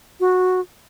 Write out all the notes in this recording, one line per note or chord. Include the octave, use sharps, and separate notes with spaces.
F#4